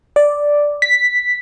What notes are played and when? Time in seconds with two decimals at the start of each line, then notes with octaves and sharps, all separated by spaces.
0.16 D5
0.82 B6